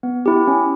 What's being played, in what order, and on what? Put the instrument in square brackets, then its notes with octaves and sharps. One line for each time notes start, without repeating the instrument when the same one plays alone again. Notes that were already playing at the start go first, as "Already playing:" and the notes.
[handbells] B3
E4 G4
C#4